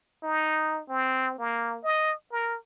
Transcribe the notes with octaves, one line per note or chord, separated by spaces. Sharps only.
D#4
C4
A#3
D#5
A#4